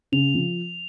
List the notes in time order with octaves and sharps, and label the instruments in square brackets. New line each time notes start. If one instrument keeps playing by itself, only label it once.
[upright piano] C#3 [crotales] F7
[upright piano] F3